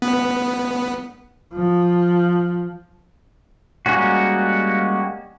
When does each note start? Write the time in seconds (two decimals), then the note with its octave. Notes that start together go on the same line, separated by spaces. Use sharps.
0.02 B3
1.54 F3
3.86 G3 G#3 A#3 C#4 F#4